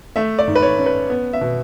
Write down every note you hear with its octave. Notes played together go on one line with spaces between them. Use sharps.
A3 E5
D5
G#2
B4
C#5
C#4
B4
B3
E5
B2